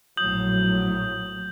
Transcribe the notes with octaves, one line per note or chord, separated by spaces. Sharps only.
A#1 A2 F#3 D#6 G6 F#7